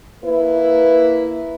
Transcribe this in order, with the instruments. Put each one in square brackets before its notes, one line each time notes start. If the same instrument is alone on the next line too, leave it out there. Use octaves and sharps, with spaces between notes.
[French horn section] A#3 E4 B4